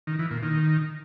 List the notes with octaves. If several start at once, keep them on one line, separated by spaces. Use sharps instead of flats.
D#3
E3
A#2
D#3